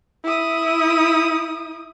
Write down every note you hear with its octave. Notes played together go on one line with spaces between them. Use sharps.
E4 D#6